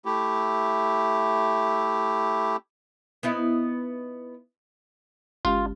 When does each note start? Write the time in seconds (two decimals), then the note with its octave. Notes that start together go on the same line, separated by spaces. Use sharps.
0.05 A3 E4 G4
3.23 B3 D#4 E4
5.45 G1 G#3 C#4 F4 G4